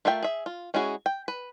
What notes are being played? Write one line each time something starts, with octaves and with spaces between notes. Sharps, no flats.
A3 F4 A#4 E5 G5
G#4 E5
F4
G#3 C#4 E4 F#4 G#4
G5
B4